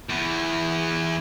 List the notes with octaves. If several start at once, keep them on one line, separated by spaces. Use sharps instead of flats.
E2 E3